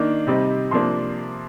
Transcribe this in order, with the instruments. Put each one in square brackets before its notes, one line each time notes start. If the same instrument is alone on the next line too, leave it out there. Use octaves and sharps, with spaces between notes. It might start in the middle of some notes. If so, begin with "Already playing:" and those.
Already playing: [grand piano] D#3 A#3 D4
C3 G3 C4 D#4
C3 F3 A#3 D4 C6